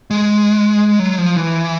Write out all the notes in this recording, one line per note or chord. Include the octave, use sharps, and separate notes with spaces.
G#3
F#3
F3
E3